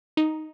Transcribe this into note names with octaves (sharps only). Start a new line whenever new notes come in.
D#4